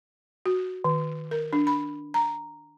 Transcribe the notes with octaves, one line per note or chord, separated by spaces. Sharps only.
F#4
D#3
A#4
D4
B5
A#5